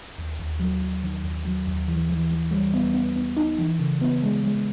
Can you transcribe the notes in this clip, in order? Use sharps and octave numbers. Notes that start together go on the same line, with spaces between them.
D#2
D#2
F#3
D#2
D#3
D#2
F#3
D#2
E3
E3
E3
G3
B3
B3
B3
D#4
E3
C#3
B3
G#3
G#3